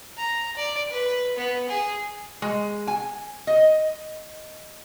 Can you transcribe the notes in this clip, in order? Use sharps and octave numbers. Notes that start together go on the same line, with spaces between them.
A#5
D5
B4
B3
G#4
G#3
G#5
D#5